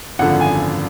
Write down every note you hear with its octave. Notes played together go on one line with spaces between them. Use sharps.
G#1 F#2 D3 F3 F#5
G#5